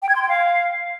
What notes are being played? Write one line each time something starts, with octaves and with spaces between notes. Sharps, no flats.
G5
G#6
C6
G5
F5